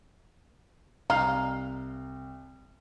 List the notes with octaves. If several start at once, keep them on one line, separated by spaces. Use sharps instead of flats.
C2 D#4 F5